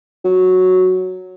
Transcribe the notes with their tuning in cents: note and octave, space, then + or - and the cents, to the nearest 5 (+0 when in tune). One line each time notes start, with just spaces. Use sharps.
F#3 -5